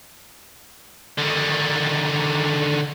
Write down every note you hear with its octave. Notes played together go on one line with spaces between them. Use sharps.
D3 D#3